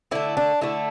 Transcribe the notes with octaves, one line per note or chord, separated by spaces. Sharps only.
D3 A3 E4
D4
D3 A3 E4